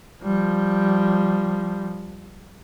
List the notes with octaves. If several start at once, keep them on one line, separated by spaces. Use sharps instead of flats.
F3 G3